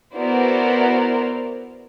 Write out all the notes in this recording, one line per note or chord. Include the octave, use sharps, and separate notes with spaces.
B3 E4 F#4 A#4 C5 D5